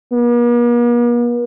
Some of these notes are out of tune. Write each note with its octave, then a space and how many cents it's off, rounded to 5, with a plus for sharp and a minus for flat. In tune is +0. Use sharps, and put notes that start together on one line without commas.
A#3 +45